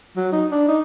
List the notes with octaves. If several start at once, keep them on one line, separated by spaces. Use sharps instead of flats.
F#3
D#4
D4
D#4